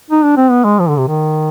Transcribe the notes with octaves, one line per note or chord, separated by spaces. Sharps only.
D#4
D4
C4
B3
G#3
F3
D3
C3
D#3